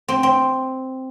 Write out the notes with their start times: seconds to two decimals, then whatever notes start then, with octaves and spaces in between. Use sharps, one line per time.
0.08 C4
0.23 C4